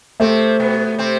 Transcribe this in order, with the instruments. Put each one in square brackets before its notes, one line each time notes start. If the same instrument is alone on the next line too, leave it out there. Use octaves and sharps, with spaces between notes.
[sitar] C3 C4 [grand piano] A3
[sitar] B2 B3
C3 C4